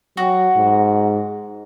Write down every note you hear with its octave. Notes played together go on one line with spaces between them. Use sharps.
F#3 F#4
G#2